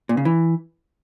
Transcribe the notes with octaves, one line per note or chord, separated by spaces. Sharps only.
A#2
C#3
E3